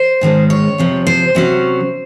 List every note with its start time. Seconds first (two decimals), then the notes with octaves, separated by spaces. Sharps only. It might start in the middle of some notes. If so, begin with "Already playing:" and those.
Already playing: C5
0.21 G#2 D#3 G#3 C#4
0.50 C#5
0.78 F2 C3 F3
1.07 C5
1.35 C3 F#3 C#4